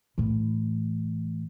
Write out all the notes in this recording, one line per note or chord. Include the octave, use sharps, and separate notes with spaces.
A2 E3